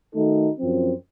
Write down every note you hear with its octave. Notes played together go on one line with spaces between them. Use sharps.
D#3 A3 D#4 F#4 A4
F#2 F3 C4